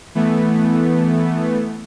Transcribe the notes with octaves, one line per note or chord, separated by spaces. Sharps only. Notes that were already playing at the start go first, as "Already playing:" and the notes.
E3 A3 B3